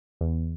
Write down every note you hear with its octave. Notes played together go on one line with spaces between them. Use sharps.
E2